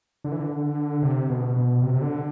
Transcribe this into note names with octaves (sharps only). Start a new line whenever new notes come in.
D3
E3
D3
C3
B2
B2
C3
C3
D3